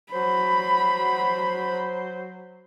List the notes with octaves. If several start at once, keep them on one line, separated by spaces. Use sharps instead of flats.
F#3 C5 B5